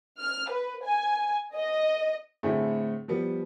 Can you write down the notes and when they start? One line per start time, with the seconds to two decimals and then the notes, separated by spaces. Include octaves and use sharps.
0.18 F6
0.49 B4
0.84 G#5
1.55 D#5
2.43 A2 D3 A3 C4 E4 G#4
3.08 F3 G3 B3